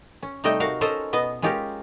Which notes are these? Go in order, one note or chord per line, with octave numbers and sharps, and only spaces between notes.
C#4
C3 G3 A3 D#4 D#5 G5
F#4 A#4 F5
C#4 A4 A#4 C5 D#5
B2 B3 D#5
G#3 C#4 F4 G4 A#4